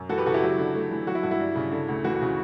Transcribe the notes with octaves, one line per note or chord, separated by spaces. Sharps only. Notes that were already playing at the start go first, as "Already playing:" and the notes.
Already playing: F#2
E3 F#4 A4
G4 B4
C#3 F#4 A4
E4 G4
F#3
D3
A3
E3
F#3 F#4
E4
G2 F#4
E4
G3
C#3
D3
D2
E3 F#4
F#4
C#3